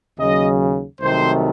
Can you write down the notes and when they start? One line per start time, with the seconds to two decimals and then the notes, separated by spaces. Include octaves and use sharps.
0.19 D#2 C#3 F#3 D#5
1.00 C2 C3 D#3 F#3 A3 C5